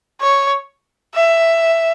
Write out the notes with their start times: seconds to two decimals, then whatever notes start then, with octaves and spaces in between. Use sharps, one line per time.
0.21 C#5
1.15 E5